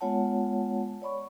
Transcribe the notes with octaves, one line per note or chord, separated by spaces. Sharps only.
G#3 B3 F4 C#5 F#5 A5
C#5 D5 B5 C#6